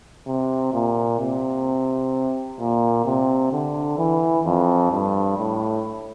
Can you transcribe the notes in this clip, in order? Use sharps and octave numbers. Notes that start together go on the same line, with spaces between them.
C3
A#2
C3
A#2
C3
D3
E3
F2
G2
A2